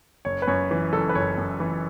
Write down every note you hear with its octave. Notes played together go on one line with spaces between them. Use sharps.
F#1 C#5
B4
F#2 C#5
E3
F#1 A4
B4
F#1 C#5
F#2
E3